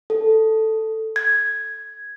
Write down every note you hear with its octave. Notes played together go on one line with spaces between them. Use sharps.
A4
G#6